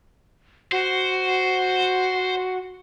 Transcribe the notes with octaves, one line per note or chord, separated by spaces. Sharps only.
F#4 C5